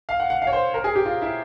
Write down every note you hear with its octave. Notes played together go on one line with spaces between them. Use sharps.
F5
F#5
F#5
F5
C#5
C5
A#4
G#4
G4
F4
E4